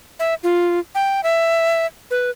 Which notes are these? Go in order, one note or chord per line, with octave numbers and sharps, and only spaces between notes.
E5
F4
G5
E5
B4